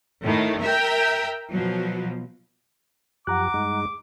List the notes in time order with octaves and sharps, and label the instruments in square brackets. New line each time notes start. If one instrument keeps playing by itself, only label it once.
[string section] A2 D#3 A3
A#4 E5 G5
B2 F3 F#3
[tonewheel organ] F#2 F3 G4 [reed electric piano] F#5 A#5 F#6 [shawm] D6
[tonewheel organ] G2 G#3 D#4